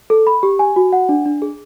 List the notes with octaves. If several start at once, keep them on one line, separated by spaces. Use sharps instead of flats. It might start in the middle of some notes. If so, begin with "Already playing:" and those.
A4
B5
G4
G#5
F#4
F#5
D4
D4
G#4